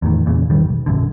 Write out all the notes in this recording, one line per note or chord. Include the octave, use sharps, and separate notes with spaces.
E2 A2 D#3
E2 A#2 C#3
G#1 E2 D#3 G3
B1
A#1 F#2 D3